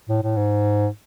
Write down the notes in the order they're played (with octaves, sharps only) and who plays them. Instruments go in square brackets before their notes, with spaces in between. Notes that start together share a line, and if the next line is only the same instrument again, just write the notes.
[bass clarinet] A2
A2
G#2